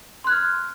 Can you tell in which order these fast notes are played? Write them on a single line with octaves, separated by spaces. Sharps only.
C6 F#6 G#6 F6